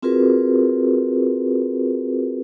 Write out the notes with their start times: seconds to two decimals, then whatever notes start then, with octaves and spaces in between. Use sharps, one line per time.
0.02 C4 F4 F#4 G#4 A#4 B4